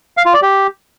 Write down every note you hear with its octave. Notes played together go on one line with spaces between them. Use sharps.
F5
F4
D5
G4